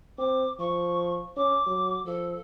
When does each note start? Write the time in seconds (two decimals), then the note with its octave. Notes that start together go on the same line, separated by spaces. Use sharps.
0.18 C4 D6
0.59 F3 C#6
1.36 C#4 D6
1.66 F#3
2.05 F3 A4